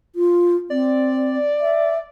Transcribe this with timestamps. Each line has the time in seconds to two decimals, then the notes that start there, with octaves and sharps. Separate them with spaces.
0.15 F4
0.70 C4 D5
1.61 E5